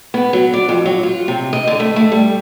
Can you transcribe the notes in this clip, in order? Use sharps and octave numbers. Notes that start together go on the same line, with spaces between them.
B3
F#3
D5
F2
F#3
F4
C3
D#5
D3
A3
A3
G3